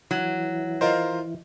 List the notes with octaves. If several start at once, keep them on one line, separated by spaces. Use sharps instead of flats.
E3 F#3
F4 A#4 C5 D#5